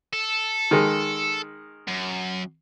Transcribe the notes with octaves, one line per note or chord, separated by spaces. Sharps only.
A4
D#3 G#3
F#2